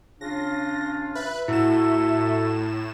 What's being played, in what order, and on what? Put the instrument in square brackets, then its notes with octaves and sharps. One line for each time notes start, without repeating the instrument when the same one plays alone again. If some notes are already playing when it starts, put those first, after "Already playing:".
[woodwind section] C#3 D4 F4 [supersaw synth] A#6
[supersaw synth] B4 F#6 [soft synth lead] E5
[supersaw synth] A2 E7 [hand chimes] E4 [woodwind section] F#4 A4